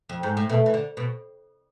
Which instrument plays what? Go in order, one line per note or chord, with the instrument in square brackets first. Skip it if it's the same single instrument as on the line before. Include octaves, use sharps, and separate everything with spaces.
[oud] F2
G#2
A2
[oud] B2 [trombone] A3
[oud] E3
D3
B2